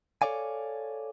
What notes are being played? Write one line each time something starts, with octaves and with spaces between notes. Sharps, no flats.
A4 A#4 C#5 D5 F5 G#5